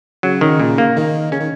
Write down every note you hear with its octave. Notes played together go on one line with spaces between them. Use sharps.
C#3 F#3
D#3
A#2
A#3
D#3
C#3 C#4
D#3